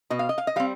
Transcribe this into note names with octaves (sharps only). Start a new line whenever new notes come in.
B2 D#5
F5
D#5
F5
D#5
G3 C4 F5